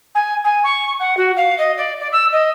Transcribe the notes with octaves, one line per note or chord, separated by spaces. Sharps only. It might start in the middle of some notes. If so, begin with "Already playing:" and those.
G#5
G#5
C#6
F#5
F#4
F5
D#5
D5
D5
E6
D#5